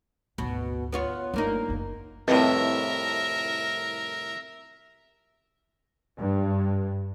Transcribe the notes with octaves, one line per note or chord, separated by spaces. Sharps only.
G#1 D2 B2
B3 F4 C#5
F#1 G2 A#3 D#4
F#1 D4
C2 F2 A2 C4 A#4 B4 D#5 E5
G2